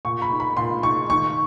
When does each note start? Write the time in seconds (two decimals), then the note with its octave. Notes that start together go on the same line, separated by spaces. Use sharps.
0.05 A#2 C#6
0.22 B5
0.31 D#4
0.40 B5
0.57 A#2 C6
0.83 D#4 C#6
1.10 D#3 C#6